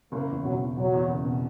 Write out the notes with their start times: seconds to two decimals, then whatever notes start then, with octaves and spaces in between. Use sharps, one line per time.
0.12 F#1 A#3
0.29 E2
0.44 B2 F#3
0.61 E2
0.77 B2 F#3
0.93 E2
1.09 F#1
1.25 B2